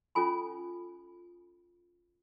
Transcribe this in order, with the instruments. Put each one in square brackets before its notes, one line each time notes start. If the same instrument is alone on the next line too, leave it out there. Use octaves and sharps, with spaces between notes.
[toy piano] C#4 F4 A4 G#5 B5